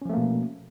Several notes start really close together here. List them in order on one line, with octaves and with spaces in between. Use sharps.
C#4 F3 A3 A#3 B2